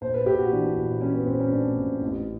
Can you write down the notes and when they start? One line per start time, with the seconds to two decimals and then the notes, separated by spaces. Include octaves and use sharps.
0.01 A#1 C5
0.14 B4
0.26 A#1 G4
0.38 F#4
0.52 E3 D4
0.77 A#1
1.01 E3 C#4
1.14 B3
1.26 A#1 C4
1.40 C#4
1.51 A2 D4
1.77 A#1
2.02 A1